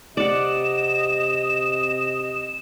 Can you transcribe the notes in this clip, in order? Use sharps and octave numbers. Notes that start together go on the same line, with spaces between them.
C3 D5 D#5 F#5 E7